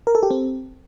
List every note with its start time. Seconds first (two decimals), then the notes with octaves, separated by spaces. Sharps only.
0.07 A#4
0.15 A4
0.23 G4
0.31 C4